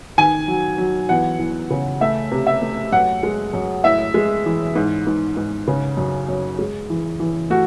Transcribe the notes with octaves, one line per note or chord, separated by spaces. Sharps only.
D#3 G#5
F#3
F#3
E2 F#5
E2
C#3
A3 E5
C3
E5
A3
F#2 F#5
G#3
F#2
A2 E5
G#3
E3
G#2
G#2
G#2
C#3
F#2
F#2
G#3
E3
E3
A3 F#4